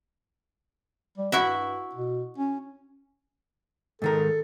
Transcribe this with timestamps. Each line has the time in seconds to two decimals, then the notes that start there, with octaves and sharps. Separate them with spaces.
1.18 G3
1.32 G2 E4 F#4 E5
1.95 B2
2.38 C#4
4.02 G#2 D#3 A4 A#4